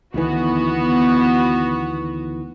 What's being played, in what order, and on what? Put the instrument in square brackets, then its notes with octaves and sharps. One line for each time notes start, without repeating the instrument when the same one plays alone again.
[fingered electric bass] D2 D#3 E3 [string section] B3 F#4